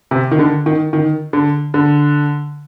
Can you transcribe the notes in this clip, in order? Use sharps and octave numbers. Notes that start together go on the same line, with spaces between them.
C3
D#3
D3
D#3
D#3
D3
D3